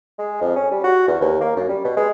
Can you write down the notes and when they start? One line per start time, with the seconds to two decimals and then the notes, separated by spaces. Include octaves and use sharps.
0.19 G#3
0.41 F2
0.56 C#4
0.71 G3
0.84 F#4
1.08 E2
1.21 D#2
1.41 A#3
1.56 F#2
1.69 G3
1.84 B2
1.97 G#3